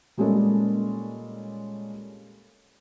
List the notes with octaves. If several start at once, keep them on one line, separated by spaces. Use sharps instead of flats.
A#2 G3 G#3 C#4 A4 A#4